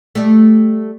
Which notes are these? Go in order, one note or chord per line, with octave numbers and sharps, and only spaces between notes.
G3 A3